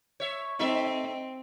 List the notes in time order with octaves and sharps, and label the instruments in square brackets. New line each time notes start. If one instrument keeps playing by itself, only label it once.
[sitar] C#5 E5
[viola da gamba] C4 [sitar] D#4 A4 E5